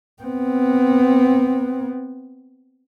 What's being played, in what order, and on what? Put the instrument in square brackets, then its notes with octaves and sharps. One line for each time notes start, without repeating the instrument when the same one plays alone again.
[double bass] B3 C4